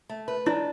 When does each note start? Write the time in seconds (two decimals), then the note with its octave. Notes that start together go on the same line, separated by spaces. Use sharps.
0.09 A3
0.28 B4
0.46 D4 E4